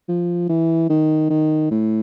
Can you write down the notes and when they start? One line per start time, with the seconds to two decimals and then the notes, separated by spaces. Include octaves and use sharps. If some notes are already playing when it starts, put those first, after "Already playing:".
0.08 F3
0.49 E3
0.90 D#3
1.30 D#3
1.71 A2